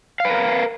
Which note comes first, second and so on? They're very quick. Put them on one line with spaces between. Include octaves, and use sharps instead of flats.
F5 B4 A#4